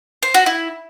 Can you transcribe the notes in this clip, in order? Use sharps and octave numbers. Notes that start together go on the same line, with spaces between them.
C5
F#4
E4